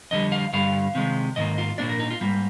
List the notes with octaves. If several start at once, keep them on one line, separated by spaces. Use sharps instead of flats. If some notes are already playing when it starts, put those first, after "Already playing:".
F2 D3 G3 D#5
F5
G2 D3 G3 F5
C3 D#3 G#3
G#2 D#3 A#3 D#5
F4
A#2 F3 A#3 D4 D5
A#4
D#4
F4
G#2 G3 A#3